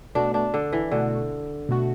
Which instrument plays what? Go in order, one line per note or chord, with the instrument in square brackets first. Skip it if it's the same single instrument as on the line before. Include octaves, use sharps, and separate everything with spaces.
[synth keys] B2 A3 F#4 [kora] D4
[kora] D4
D3
E3
[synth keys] B2 A3 F#4 [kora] D3
[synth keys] B2 A3 F#4